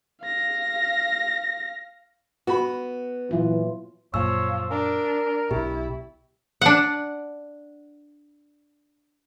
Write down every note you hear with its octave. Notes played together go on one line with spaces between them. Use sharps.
F5 A#6
B3 F#4 B5
A#2 E3 F#3 F4
F#2 A#2 F3 C#5 E6
D4 A#4
B1 B2 E4 G4
D4 F#5